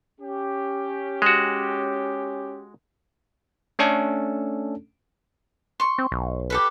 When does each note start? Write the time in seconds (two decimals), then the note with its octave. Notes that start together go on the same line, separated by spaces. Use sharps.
0.20 C#4 G4
1.22 G#3 F#4
3.79 A3 C#4 D4 A4
5.80 C6 C#6
5.98 C4
6.12 B1
6.50 G4 A4 B4